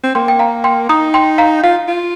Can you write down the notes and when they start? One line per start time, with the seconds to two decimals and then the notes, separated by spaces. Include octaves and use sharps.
0.03 C4
0.15 A#3 G5 C6
0.28 G5
0.39 F5 A#5
0.64 G5 C6
0.89 D#4 A#5 D#6
1.14 G5 C6
1.38 F5 A#5
1.63 F4 F5
1.88 F4